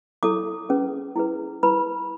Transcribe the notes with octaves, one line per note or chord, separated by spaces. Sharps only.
E4 A4 C#5 D6
C#4 G#4 B4
E4 G#4 B4
E4 B4 B5